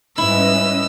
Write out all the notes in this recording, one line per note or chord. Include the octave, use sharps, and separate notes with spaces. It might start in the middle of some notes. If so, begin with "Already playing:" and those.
G#2 G3 C#4 E4 B4 D#5 E6